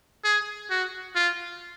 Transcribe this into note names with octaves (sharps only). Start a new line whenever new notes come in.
G#4
F#4
F4